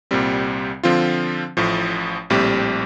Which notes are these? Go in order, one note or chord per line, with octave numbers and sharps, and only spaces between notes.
C2 A#2 G3 C4
D3 F3 C4 F4
A1 A2 F3
A#1 A2 G3 C4 G4